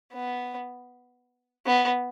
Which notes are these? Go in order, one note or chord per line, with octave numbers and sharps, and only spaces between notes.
B3
B3